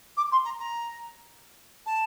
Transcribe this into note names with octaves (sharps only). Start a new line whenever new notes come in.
D6
C6
A#5
A#5
A5